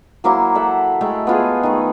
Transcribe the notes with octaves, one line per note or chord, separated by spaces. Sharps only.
F#3 A#3 E4 C6
A4 E5 F#5
G#3 A3 A4 G5
B3 F4 G#4
D#3 A3